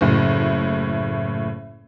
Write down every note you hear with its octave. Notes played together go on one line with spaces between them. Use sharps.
F#1 A2